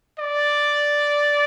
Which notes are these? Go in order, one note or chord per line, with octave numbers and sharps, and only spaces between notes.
D5